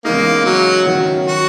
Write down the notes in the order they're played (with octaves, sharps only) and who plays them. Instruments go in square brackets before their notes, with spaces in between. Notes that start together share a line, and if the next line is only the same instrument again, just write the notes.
[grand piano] E2 C#3 G#3 D#4 [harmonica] A#3
[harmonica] F#3
[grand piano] D#3 F#3 C#4 F#4
[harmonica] F#4